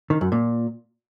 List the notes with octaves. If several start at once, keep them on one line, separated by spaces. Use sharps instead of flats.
D#3
F#2
A#2